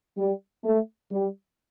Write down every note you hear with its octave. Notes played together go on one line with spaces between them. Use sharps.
G3
A3
G3